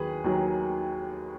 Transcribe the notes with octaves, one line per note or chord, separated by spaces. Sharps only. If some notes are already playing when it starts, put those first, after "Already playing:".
Already playing: D#2 D#3 F#3 G#4 B4
D#2 D#3 F#3